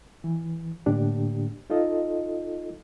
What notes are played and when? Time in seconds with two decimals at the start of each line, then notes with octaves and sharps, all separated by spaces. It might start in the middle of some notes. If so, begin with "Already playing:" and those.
0.24 E3
0.86 A2 D3 A#3 D4 G4
1.70 D#4 F4 A4 D#5